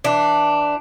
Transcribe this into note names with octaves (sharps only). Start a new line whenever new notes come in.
E3 D4